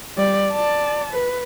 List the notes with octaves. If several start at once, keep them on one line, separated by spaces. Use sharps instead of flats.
G3 D5
D5 A5
B4